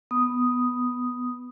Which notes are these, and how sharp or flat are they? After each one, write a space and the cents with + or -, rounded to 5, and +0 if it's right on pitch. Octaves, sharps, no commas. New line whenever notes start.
B3 +0 D#6 +0